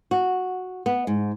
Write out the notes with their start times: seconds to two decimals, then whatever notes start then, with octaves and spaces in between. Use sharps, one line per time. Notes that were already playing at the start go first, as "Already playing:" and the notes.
0.11 F#4
0.86 B3
1.07 G#2